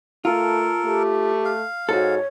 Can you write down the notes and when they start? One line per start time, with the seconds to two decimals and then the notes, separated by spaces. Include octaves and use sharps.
0.25 A3 F4 A4 A#4
0.84 A3 G4
1.45 F5
1.89 G#2 F#4 A4 C#5